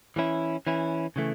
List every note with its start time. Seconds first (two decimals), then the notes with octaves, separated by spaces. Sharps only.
0.16 E3 C#4 E4
0.67 E3 C#4 E4
1.16 C#3 E3 A3